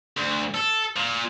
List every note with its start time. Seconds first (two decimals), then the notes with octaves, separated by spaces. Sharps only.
0.17 D2
0.54 A4
0.96 A#2